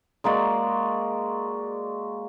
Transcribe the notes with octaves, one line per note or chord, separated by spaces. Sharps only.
G#3 A#3 F#4 D5